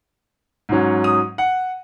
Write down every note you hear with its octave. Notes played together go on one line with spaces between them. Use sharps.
G#2 F#3 C#4
D#6
F#5